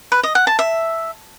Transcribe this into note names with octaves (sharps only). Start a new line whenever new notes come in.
B4
D#5
F#5
A5
E5